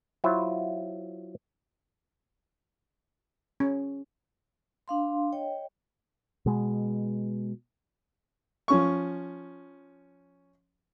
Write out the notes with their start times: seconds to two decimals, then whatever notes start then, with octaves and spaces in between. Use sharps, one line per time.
0.24 F#3 E4 F4 C5
3.60 C#4
4.88 D4 F5 C6
5.33 C#5 D#5 G5
6.46 B2 G#3
8.68 F3 C#4 C#6